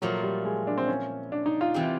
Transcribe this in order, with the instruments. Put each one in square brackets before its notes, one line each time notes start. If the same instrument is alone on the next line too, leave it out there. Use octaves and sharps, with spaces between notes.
[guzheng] A#2 F3 A3 [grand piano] F#3
[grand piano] G3
G#3
D4
C4
C#4
D4
D#4
F4
[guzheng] C3 E3 G3 C4